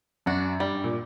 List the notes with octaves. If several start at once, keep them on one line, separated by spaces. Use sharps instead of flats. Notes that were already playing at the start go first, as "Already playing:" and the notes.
F#2 D4 F#4
G2 G3
A#2